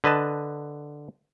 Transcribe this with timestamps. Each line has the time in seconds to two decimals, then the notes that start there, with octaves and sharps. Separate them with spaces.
0.04 D3 B4 D#5 A5